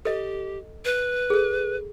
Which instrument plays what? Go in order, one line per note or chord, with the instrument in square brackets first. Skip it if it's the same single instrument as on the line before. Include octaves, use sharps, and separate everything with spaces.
[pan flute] G4 [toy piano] A4 D#5
[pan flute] B4
[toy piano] G#4 A4